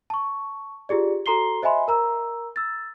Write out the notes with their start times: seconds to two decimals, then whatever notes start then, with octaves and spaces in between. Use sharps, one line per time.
0.10 A5 C#6
0.89 F4 G4 G#4 D5
1.26 F#4 A4 A#5 C6 C7 G7
1.63 C5 D#5 E5 G#5 B5 C6
1.88 A#4 A#5 E6
2.56 E6 A6